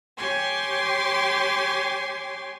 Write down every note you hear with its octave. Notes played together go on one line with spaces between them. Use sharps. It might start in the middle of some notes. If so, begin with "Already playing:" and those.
G4 C#5 G5 G#5 C6 D6